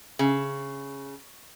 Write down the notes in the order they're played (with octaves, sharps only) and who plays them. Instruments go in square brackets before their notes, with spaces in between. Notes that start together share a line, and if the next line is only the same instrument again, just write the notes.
[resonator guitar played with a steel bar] C#3